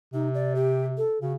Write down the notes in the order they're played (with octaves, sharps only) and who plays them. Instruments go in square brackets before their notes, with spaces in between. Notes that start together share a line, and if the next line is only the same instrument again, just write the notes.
[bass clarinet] C3 [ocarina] D#4
[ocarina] D5
G4
A4
[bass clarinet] C#3 [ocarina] F#4